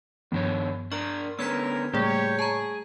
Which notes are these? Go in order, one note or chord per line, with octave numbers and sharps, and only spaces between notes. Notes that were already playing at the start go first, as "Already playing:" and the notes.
G2 D#3 F3 B3 D4 C#5
D4 A#4 C#6 F6
D3 B3 C#4 A#4 E6 G#6 B6
A2 C#3 G3 A3 A#3 G4 G#4 C#5
G#4 A5 A#5